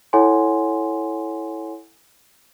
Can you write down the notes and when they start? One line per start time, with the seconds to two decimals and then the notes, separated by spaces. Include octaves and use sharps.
0.13 E4 A4 C#5 F#5 G#5 C6